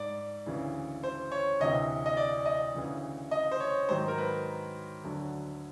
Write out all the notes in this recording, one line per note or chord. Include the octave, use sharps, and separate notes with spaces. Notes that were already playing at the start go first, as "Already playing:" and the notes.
Already playing: G#2 D5
D2 C#3 E3
C5
C#5
D2 C3 E3 D#5
D#5
D5
D#5
D2 C#3 E3
D#5
C5
C#5
G#2 D#3 F#3 C5
A#4
B4
D2 D3 F#3